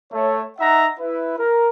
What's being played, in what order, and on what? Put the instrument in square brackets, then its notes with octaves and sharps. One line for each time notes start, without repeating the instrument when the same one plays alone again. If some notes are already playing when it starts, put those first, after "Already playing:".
[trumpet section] A3 C#5
D#4 E5 F#5 A#5
E4 B4
A#4